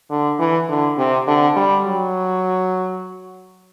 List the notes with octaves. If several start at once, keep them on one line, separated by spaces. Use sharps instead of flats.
D3
E3
D3
C3
D3
G3
F#3